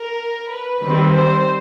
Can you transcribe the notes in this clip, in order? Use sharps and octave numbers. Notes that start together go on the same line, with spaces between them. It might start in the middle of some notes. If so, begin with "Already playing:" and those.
Already playing: A#4
B4
D#3 G3 C4 B4
C5